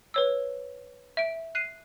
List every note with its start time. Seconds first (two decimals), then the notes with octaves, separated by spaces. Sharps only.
0.14 B4 C#5 E6
1.17 E5 D7
1.55 F#6 C7 D#7